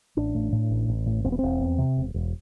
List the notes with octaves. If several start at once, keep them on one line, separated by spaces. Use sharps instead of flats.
A1 D4
A2
A2
A1
A1
A2
E1 C4
B3
E1 C4
E2
C3
E1
E1